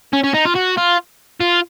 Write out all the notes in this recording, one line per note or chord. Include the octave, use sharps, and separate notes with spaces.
C#4
C#4
D#4
F4
F#4
F4
F4